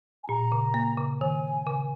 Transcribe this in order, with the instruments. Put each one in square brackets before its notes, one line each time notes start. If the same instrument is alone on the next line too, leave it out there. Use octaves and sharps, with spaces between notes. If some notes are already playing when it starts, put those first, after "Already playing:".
[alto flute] G#5
[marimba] A#2 [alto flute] A#5
[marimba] C#3
A#3
C#3
[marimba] D#3 [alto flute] G#5
[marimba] C#3